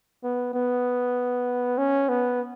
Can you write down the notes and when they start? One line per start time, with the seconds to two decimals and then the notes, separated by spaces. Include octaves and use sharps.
0.24 B3
0.54 B3
1.78 C#4
2.09 B3